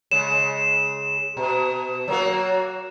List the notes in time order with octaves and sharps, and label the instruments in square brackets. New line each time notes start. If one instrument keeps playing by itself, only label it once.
[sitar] C#3 G#3 [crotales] E7
[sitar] B2
F#3 A#3 F#4